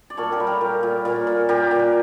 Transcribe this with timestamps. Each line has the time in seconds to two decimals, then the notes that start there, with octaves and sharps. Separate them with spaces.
0.10 D5
0.17 A#2 A4 C#5
0.32 G4 A#4
0.40 G3
0.47 G4 A#4
0.61 A#2
0.83 A#2
1.05 A#2
1.27 A#2
1.49 A#2 G4 A#4
1.71 A#2